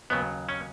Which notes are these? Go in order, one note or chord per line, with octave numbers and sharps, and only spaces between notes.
D#2 C#3 F#3 B3
C#4